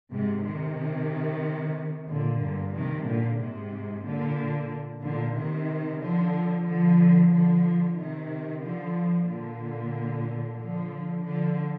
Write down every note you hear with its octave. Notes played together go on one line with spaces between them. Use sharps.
G#2 C3
C3 D#3
A#2 D3
G2 A#2
C3 D#3
A#2 D3
G#2 C3
A#2 D3
A#2 D3
C3 D#3
D3 F3
D3 F3
D3 F3
C3 D#3
D3 F3
A#2 D3
D3 F3
D3 F3